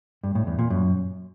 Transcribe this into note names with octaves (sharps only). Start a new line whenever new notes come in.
G2
A2
E2
A#2
F#2